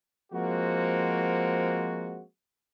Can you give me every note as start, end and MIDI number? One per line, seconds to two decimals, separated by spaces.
0.33 2.21 53
0.33 2.21 56
0.33 2.21 58
0.33 2.21 60
0.33 2.21 66